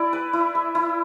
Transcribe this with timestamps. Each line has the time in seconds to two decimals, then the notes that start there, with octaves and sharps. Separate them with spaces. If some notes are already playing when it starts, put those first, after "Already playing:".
Already playing: E4 D5
0.13 B4
0.33 E4
0.55 E5
0.75 E4